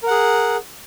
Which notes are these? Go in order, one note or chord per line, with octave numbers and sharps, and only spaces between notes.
G#4 A#4 F#5